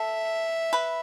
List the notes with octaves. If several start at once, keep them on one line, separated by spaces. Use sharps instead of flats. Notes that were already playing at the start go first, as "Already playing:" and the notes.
Already playing: A4 E5
B4